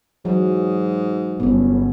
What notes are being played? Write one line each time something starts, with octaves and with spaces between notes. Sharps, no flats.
G#2 E3 F#3 G#4
G1 B3 C#4